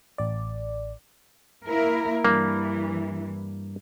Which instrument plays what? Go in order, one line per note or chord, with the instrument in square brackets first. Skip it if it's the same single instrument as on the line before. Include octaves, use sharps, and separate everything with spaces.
[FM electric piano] A1 D5
[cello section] A#3 E4 A#4
[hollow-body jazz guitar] G2 G3 D4 [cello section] E3 [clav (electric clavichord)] A#3